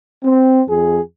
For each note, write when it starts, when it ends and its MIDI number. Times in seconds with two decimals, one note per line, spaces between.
0.23 0.61 60
0.68 1.01 41
0.68 1.01 68